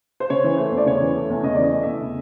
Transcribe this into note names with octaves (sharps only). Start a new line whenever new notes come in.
C5
C#3 C#5
E3
A3 C5
E2
D5
C#3 C#5
E3
A3
E2
C#3 D#5
E3 D5
D#5
A3
E2 E5
C#3